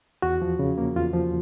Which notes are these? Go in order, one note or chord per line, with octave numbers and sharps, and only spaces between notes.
E2 F#4
F3
C#3
A#3
E2 F4
F3